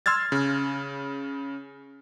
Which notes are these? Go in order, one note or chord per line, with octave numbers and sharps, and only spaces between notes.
C6 E6 F6 G#6 A6
C#3